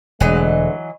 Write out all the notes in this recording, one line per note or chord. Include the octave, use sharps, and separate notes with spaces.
E1 D2 E3 F#3 G#3 D#5